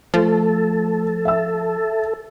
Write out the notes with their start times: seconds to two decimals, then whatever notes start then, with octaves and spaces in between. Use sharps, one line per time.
0.14 F3 A3 A4
1.25 E5 E6